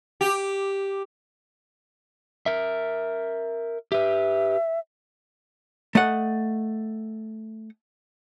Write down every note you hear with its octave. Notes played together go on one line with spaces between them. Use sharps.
G4
A#4 E5
G4 B4 E5
A3 D#5 F#5